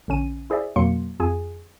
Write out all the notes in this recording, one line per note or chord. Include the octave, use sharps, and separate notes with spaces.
A#1 D3 C#4 D#7
E4 G#4 C5 D5 E5
F2 B2 F#3 A#3 C6 C#7
F2 F4 G#4 G#5